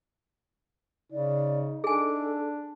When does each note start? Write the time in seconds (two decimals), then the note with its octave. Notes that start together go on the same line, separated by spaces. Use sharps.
1.12 C#3 D#4 D5
1.84 D4 G#4 A4 G#5